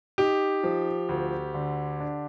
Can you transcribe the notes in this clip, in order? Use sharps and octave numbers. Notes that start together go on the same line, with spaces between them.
D#4 G4
F3
D2
D3
D4